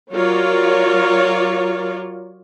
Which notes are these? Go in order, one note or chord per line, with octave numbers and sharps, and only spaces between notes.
F#3 F4 A#4 C#5 D5